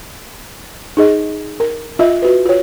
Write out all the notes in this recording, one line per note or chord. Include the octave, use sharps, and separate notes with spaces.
D#4 G#4 D#5
A#4
F4 D#5 E5
F#4 B4
F4 C#5